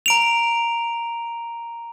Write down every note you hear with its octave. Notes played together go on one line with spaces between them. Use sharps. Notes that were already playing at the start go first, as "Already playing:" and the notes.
A#5 D7 F7